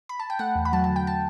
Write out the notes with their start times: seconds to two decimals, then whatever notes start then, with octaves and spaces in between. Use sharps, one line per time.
0.09 B5
0.19 A5
0.30 G5
0.39 A3 F#5
0.55 E2
0.65 B5
0.73 F#3 A5
0.84 A5
0.89 D3
0.96 G5
1.07 A5